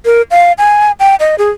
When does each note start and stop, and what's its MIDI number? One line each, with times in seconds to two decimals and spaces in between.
0.05 0.22 70
0.31 0.53 77
0.58 0.92 80
1.00 1.15 79
1.20 1.35 75
1.38 1.50 68